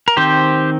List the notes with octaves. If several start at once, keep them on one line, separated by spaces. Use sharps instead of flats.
A#4
D#3 C4 G4 C5